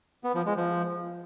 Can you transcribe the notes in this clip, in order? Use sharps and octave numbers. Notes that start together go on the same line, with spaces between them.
B3
F3
G#3
F3